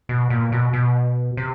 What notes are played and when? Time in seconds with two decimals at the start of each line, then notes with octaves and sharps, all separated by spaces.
0.09 B2
0.30 A#2
0.52 B2
0.73 B2
1.37 C3